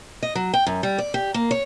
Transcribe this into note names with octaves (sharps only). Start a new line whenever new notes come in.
D#5
F#3
G5
F#2
G3
D5
G4
A#3
C#5